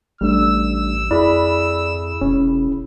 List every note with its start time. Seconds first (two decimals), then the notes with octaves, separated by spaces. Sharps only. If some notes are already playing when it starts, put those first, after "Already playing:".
0.21 A1 G3 A3 D4 E6
1.11 F2 E4 G#4 D5 B5
2.21 E1 C#4